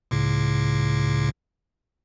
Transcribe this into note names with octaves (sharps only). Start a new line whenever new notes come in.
C#2 A2 C#3